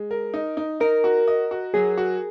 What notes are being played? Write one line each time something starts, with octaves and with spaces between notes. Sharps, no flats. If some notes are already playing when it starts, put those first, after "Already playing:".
Already playing: G#3
A#4
D#4
D#4
D#4 A#4
F#4
D#5
F#4
F#3 G#4
F#4